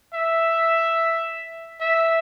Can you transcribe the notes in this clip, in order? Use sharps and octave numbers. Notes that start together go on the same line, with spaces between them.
E5
E5